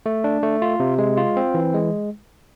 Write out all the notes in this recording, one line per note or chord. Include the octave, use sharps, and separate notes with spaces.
A3
D4
A3
F4
C3
G#3
F4
C4
E3
G#3